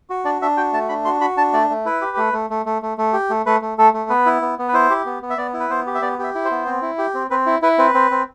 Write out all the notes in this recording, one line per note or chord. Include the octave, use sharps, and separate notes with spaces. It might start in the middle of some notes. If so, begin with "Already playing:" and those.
F#4
D4 D5
D4 E5
F#4 G5
A3 A5
D4 B5
F#4 C6
F#4 B5
D4 A5
A3 D5
A3
E4 B4
G4
A3
A3
A3
A3
A3
A3
G4
A3
A3 B4
A3
A3 A4
A3
B3 B4
E4
B3
B3
B4
E4 C5
G4
B3
B3
E5
B3 D5
E4
B4
B3 C5
G4
E5
B3 D5
G4 E5
E4
C5
B3
C4
E4
G4
C4
C4 B4
E4
E4 B4
C4 B4
C4
C4